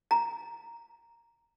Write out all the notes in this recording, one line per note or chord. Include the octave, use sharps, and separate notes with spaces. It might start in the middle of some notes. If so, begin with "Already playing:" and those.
A#5